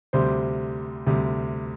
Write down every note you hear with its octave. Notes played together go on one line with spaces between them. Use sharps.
D2 C3 G3 C5
D2 C3 G3